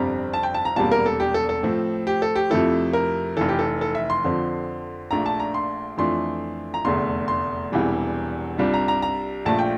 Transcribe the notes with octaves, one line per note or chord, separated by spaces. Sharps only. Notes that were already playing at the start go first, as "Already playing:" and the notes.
Already playing: G1 F2 C3 G3 C4 A#5
A5
G5
A5
A#5
E1 E2 C3 G3 A#3 A5
A#4
A4
G4
A4
A4
A2 F3 C4
G4
A4
G4
F2 C3 F3 A3 E4 A4
A#4
F1 F2 E3 A4
G4
A4
A4
E5
C6
F2 D3 F3 C4
A#1 A#2 A3 D4 A#5
A5
A#5
C6
F2 E3 A3 D4 F4 C6
A#5
F1 E2 D3 A3 C6
C6
E1 E2 C3 E3 G3
C2 C3 G3 D4 F4
A#5
A#5
A#5
A#1 A#2 F3 A3 A5
G5